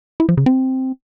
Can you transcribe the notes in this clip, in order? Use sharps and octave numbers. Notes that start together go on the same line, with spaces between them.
E4
F3
C#3
C4